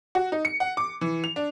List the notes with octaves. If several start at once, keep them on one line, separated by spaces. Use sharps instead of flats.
F#4
D#4
C#7
F#5
D6
E3
F7
D4